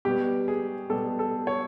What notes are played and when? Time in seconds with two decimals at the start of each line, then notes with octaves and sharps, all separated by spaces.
0.05 B2 G3 B3 G4
0.48 G#4
0.90 B2 G3 B3 A4
1.19 A4
1.47 C#5